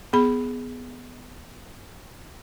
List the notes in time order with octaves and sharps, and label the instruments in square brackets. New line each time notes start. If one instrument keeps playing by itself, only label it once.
[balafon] B3 G#4 B5